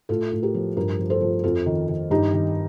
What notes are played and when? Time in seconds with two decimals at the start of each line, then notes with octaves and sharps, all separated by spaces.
0.09 A2 F4 A4
0.32 A2
0.43 G4 A#4
0.54 F3
0.77 G2 G4 A#4
0.99 F3
1.10 A4 C5
1.21 F3
1.44 F2 F4 A4
1.66 D#3
1.88 D#3
2.11 G2 D#4 G4
2.33 D#3